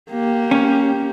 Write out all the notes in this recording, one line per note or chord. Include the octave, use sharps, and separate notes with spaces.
A#3 G4
C#4